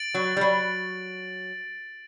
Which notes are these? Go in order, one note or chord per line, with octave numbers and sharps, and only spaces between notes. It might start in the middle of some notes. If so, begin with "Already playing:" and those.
Already playing: A6 D7 F#7
F#3
G3
F#3